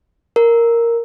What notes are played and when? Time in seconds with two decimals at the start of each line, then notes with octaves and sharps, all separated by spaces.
0.36 A#4